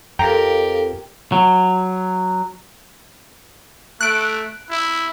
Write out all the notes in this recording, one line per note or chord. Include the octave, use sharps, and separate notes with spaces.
F2 G4 A4 A#4 F5 G5 A#5
F#3
A3 F#6 D7
E4